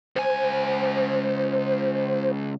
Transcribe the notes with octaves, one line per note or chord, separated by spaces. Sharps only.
C#2 C5 G#5